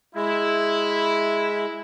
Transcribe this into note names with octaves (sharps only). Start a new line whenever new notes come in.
G#3 E4